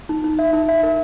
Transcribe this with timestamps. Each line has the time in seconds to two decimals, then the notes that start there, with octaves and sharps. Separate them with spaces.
0.09 D#4
0.24 D#4
0.39 E5
0.53 D#4
0.68 E5
0.83 A#4